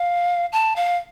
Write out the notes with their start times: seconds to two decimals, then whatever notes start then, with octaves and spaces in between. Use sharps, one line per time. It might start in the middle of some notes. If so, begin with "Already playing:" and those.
Already playing: F5
0.53 A5
0.76 F5